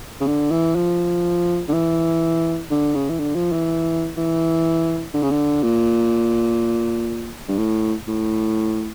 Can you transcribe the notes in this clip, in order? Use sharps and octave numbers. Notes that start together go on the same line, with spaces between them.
C#3
D3
E3
F3
D3
E3
D3
C#3
E3
D3
F3
E3
E3
D3
C#3
D3
A#2
G2
A2
A2